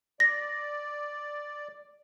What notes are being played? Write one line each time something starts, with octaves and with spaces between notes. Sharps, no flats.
D5 A#6